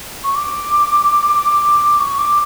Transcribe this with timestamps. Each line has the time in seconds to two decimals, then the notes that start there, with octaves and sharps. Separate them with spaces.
0.24 C#6
0.35 D6
2.00 C#6
2.18 D6